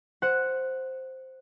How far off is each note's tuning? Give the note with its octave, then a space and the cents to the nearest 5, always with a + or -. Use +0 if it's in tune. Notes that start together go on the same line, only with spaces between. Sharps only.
C5 +0 F#5 +0